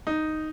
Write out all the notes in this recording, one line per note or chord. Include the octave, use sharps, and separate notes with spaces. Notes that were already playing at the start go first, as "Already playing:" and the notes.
D#4